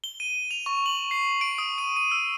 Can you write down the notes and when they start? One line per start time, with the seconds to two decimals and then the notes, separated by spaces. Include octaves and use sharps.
0.04 G7
0.20 D#7
0.51 F7
0.66 C#6
0.86 F#7
1.11 C7
1.41 D7
1.58 D#6
1.78 D#7
1.97 D#7
2.11 E6